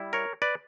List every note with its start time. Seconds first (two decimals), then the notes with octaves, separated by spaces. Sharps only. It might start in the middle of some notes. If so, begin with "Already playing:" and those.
Already playing: G3 E4
0.13 A#4 C#5
0.42 B4 D5